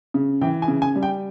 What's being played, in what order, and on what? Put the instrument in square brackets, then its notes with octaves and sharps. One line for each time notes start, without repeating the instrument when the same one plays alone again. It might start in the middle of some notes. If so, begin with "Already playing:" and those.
[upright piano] C#3
E3 G5
G#5
C#3
G#5
G3
G5